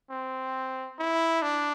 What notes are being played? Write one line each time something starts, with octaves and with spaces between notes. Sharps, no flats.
C4
E4
D4